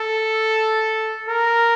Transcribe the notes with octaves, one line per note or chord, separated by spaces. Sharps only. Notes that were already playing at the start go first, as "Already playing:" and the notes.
Already playing: A4
A#4